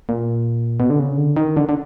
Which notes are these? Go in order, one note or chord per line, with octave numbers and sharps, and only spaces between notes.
A#2
B2
D3
C#3
D3
D#3
D3
D3